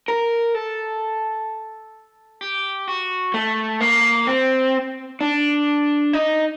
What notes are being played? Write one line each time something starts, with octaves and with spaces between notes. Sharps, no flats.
A#4
A4
G4
F#4
A3
A#3
C4
D4
D#4